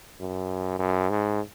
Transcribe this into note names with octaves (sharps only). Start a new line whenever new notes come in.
F#2
F#2
G#2